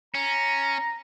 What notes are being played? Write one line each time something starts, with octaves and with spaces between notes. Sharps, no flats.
C#4 A#5